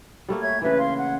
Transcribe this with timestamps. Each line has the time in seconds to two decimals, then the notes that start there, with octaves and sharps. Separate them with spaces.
0.29 G3 A3 A#3
0.41 C#5 E5 G#6
0.62 C#3 E3 B4 E5
0.78 F5 C6
0.99 F#5